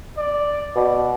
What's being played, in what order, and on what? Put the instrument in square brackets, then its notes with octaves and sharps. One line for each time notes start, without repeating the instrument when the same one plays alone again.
[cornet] D5
[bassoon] B2 [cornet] D5